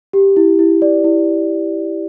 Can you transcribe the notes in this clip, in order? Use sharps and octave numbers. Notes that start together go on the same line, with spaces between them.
G4
E4
E4
D5
E4